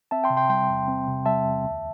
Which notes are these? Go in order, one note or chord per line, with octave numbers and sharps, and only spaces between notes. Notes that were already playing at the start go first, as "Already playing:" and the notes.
C4 E5 A5
G5 C6
C3
G5 C6
G3 G5 C6
E2
C4
C3
G3 E5 A5
E2
D2